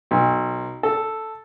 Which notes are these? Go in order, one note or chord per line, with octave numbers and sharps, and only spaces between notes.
B1
A4